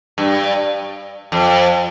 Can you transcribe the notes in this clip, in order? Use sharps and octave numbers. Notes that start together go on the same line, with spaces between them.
G2
F2